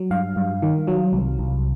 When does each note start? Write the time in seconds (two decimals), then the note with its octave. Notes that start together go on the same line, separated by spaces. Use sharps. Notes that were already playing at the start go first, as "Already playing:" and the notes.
Already playing: F#3
0.11 G2 F5
0.36 G2
0.62 D#3
0.87 F#3
1.13 C2
1.39 C2